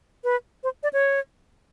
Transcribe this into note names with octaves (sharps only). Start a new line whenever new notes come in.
B4
C5
D5
C#5